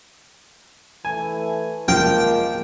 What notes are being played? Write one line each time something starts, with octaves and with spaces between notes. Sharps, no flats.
E3 A3 G#5
F3 G#3 A#3 G5 F6